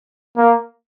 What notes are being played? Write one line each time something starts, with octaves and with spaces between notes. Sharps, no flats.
A#3